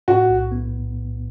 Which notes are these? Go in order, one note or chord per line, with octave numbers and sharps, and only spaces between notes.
A2 F#4
B1
B3